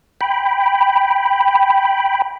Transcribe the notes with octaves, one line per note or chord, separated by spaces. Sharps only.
G5 B5